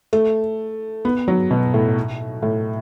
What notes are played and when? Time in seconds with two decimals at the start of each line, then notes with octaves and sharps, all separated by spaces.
0.13 A3
1.05 B3
1.28 F#3
1.51 B2
1.74 A2
2.42 A2